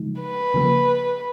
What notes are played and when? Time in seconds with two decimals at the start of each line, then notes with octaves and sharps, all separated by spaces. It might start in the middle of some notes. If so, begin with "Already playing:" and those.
Already playing: C#3 F3 G#3 D#4
0.21 B4
0.54 C#3 F3 A#3